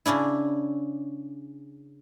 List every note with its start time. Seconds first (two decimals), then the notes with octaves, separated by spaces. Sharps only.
0.06 C#3 C#4 D4 E4